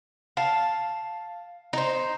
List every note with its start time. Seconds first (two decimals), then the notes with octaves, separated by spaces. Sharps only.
0.37 F5 A5
1.73 D#4 C5